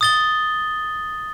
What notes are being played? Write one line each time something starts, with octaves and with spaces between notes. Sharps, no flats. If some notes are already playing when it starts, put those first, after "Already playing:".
D#6 A6 G7